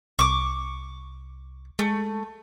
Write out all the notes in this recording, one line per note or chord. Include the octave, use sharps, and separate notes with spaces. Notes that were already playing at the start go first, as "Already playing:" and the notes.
C2 C#6 D6
G#3 A3